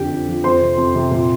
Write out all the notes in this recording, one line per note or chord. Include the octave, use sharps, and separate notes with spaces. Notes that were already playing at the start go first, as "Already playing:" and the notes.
Already playing: F2 D3 G4 G5
F2
F3
F2 C5 C6
C3
F2
C3
A#2